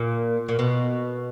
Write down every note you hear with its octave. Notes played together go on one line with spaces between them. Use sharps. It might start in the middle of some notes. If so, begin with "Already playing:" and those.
Already playing: A#2
A#2
B2